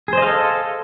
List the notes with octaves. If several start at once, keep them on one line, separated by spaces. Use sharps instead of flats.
G#4 A4 C5 D#5 F5